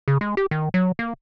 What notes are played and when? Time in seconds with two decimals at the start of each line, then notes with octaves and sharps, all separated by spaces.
0.08 C#3
0.21 G#3
0.37 G4
0.51 D#3
0.74 F#3
0.99 A#3